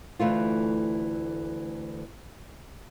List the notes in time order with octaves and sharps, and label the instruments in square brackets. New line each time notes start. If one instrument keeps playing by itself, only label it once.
[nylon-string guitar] D2 E3 A3 F4